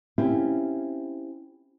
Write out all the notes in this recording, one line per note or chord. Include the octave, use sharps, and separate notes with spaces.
C4 C#4 E4 F4 G4